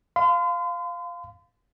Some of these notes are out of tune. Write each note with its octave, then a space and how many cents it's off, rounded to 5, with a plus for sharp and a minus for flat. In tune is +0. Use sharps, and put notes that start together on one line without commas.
F5 +0 C6 -40